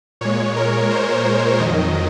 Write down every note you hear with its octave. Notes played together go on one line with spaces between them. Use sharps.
A#2 G#3 C#5
A#4
C5
F2 D#3 F#3 D#5